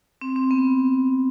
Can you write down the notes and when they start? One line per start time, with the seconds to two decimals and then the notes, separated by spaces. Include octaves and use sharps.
0.21 C4
0.36 C4
0.51 B3